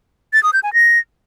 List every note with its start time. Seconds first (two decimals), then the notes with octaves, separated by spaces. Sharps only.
0.33 A6
0.43 D#6
0.53 G6
0.63 G#5
0.73 A#6